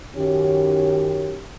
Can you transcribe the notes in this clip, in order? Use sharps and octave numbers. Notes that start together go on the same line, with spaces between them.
F#2 D#3 C#4 G4